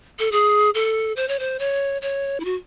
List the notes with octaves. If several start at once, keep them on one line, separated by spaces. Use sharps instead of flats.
A4
G#4
A4
C5
C#5
C5
C#5
C#5
E4
F#4